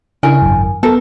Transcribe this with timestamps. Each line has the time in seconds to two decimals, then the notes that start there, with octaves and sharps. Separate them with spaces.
0.23 C#3 D4 E4 A#4 G#5
0.42 G#1 F#2
0.83 B3 A4 A#4